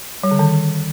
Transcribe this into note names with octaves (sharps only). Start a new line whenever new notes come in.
G3
D3
D#3